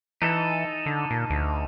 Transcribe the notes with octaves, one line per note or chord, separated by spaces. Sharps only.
E3 D#4 A4
D3
A#2
D2